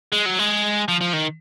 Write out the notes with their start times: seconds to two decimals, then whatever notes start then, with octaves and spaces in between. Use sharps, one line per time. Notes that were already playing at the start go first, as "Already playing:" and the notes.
0.12 G#3
0.25 F#3
0.39 G#3
0.88 F3
1.01 F3
1.13 D#3